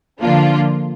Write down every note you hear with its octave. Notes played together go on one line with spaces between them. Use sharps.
D3 F3 A#3 D4 F4